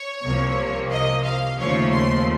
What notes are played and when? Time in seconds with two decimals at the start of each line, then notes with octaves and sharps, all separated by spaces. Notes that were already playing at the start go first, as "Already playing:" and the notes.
Already playing: C#5
0.24 C2 C3 F3 A#3
0.92 D#5
1.25 F5
1.59 D#2 C#3 F3 A3 C#5
1.92 C6